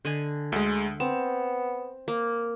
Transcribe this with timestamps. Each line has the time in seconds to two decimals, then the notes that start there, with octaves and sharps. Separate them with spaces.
0.05 D3 D#5 G#5
0.52 D2 G#3 E5
1.00 B3 C4 E7
2.08 A#3